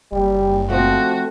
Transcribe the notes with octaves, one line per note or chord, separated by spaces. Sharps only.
F#1 G3
F3 A3 C4 F#4